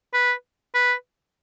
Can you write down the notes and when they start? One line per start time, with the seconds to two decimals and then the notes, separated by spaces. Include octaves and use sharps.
0.14 B4
0.75 B4